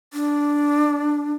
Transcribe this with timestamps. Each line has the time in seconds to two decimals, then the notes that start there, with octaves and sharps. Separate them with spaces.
0.13 D4